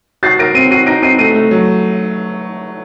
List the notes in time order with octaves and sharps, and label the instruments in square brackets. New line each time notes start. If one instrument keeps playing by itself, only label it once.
[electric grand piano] F#4 [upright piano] A6 C7
[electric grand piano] A#4 [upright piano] A#6 D7
[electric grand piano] C4 [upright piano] C7 D#7
[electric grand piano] F#4 [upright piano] C7 D#7
[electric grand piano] D#4 [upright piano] A#6 D7
[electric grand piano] C4 [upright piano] C7 D#7
[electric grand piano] A3 [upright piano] C7 D#7
[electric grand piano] A3
F#3